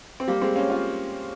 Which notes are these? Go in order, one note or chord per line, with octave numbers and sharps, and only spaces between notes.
C4
G3 A#3
G#3 C4
A#3 C#4
C#4 F4